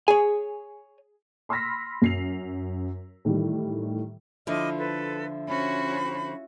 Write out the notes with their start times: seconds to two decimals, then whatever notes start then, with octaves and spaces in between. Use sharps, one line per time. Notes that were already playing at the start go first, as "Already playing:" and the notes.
0.08 G#4 C#5 G#5
1.49 B5 C6 E6 F6 A#6 B6
2.02 F#2 C7 F7
3.25 A2 D#3 E3 G3
4.47 D3 F3 E4 F4 D#5 D6 F6
4.78 A4 B4
5.47 C#4 F#4 C5 B5